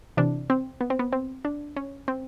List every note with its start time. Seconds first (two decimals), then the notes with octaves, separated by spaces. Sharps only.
0.17 C3 E3 D4
0.50 C4
0.81 B3
0.90 C4
0.99 B3
1.13 C4
1.45 D4
1.77 C#4
2.08 C4